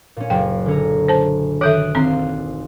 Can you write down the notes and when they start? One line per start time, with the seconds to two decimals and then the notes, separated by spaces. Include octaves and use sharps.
0.16 A#2 C#4
0.30 F#1 G5
0.66 D3 C#4 A#5
1.08 C5 A5
1.61 D#3 A4 E5 D#6 F#6 D7
1.95 D#1 C4 A#5 C6